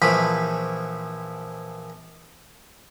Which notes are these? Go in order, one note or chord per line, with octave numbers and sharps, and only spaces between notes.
A#1 E3 F3 B5 C#6